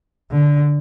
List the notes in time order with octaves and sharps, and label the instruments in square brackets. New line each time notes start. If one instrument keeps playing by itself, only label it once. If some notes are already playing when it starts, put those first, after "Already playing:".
[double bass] D3